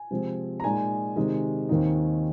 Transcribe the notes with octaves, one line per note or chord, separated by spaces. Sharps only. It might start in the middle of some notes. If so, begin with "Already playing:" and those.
Already playing: G#5
C3 F3 G#3 C4
A#5
A#2 G#3 D#4 G#5
C3 D#3 G#3 D#4
D#2 D#3 C4 D#4